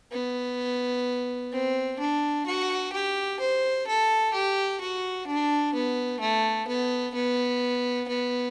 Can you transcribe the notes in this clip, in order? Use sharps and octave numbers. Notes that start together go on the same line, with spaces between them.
B3
C4
D4
F#4
G4
C5
A4
G4
F#4
D4
B3
A3
B3
B3
B3